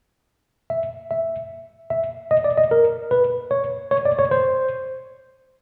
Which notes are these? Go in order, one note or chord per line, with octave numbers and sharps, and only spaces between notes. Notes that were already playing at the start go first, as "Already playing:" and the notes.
E5
E5
E5
D#5
D5
D#5
A#4
B4
C#5
C#5
D5
C#5
C5